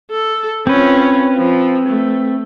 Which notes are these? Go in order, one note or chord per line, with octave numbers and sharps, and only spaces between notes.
A4
C4 C#4 F4 B4
F3
A3